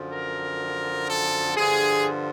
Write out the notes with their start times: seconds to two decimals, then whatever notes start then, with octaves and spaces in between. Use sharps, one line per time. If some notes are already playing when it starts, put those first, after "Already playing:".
Already playing: F#2 D3 F3
0.13 A#4
1.10 A4
1.57 G2 D3 F3 G#4